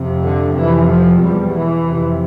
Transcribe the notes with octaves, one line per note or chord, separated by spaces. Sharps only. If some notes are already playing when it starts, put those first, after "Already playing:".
Already playing: F2 C3
D3
F2 C3 E3
F3
E2 B2 G3
E3
F2 C3